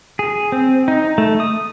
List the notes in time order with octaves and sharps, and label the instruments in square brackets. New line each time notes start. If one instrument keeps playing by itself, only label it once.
[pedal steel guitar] G#4
C4
D#4
A3
D#6